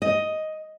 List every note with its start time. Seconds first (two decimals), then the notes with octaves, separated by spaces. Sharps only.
0.02 D#5